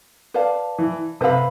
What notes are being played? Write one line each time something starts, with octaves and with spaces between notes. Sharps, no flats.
B4 D5 F5 A5
E3
C3 B4 F5 B5